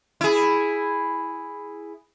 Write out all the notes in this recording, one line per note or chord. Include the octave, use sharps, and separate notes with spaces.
E4 G#4